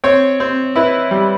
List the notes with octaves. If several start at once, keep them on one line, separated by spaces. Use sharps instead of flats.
C4 C#5
C4
E4 B4
G3